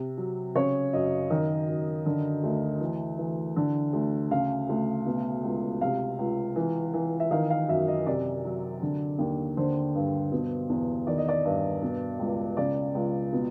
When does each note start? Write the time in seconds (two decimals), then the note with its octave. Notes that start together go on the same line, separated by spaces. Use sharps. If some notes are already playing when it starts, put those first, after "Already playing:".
Already playing: C3
0.17 F#3
0.55 C#3 C#5
0.93 F#2 D#5
1.30 D#3 D#5
1.68 F#2
2.06 D3
2.44 D2
2.80 E3
3.18 E3
3.56 D3
3.93 D2
4.31 C#3 F5
4.69 D2
5.06 B2
5.44 C#2
5.81 C3 F5
6.19 C#2
6.56 E3
6.94 E3
7.20 E5
7.31 D#3 F5
7.50 F5
7.69 F#2 E5
7.88 D#5
8.06 C3 D5
8.45 F#3
8.82 D3
9.19 D#2
9.57 D3 C5
9.95 G2
10.32 B2
10.70 E2
11.07 D#3 D5
11.18 D#5
11.28 D5
11.45 G2
11.82 B2
12.19 C#2
12.57 C#3 D5
12.95 C#2
13.33 B2